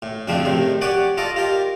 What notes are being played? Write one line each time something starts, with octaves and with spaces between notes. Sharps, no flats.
A2
F2 A2 C#3 F3 C4 D4
A2 C3 D#3
G4 C#5 D5 F#5 G#5
F4 A4 D5 D#5
F4 G4 A#4